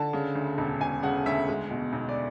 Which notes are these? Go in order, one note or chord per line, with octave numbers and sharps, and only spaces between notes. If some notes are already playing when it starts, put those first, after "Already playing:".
Already playing: D3 A5
C#3
D2
E1
E1 G#5
C#3 F#5
D2 E5
G#3
B2
B1
D5